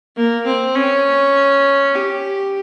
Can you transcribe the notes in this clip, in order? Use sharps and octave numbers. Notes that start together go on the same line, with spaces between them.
A#3
C4
C#4
G4